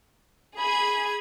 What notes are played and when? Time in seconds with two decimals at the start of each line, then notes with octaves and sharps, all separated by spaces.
0.58 G#4 B5 G#6